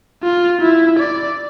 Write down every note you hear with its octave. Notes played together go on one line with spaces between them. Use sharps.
F4
E4
D5